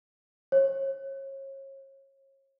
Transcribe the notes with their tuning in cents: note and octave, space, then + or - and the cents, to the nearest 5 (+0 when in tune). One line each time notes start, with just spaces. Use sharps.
C#5 -35